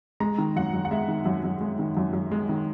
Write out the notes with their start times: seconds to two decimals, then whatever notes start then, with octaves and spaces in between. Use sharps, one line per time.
0.20 G#3 A#5
0.38 D#3
0.56 F#2 F#5
0.73 F#2
0.85 F#5
0.91 G#3 E5
1.08 D#3
1.25 F#2
1.44 F#2
1.61 G#3
1.79 D#3
1.97 F#2
2.13 F#2
2.32 G#3
2.49 D#3